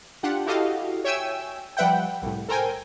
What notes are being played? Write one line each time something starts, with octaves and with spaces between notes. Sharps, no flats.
D4 F4 G4 F#5
E4 F#4 G4 A4 D#5 F5
C#5 E5 G5 G#5 E6
F3 G3 B4 E5 F#5 G5
C2 A2
A4 A#4 C5 G5 G#5